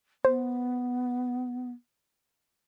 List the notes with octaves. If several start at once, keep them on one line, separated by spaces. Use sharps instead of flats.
B3 C5